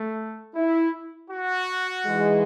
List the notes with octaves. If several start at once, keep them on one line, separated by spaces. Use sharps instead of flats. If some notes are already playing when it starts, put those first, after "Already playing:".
Already playing: A3
E4
F#4
G#2 E3 G#3